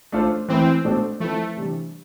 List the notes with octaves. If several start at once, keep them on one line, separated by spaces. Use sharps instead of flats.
A3 D4 F4 A4 C5
E3 A3 C4 E4 B4
B2 A3 D4 A4 C5
F3 A3 C4 E4 B4
C3 E3 G3 D4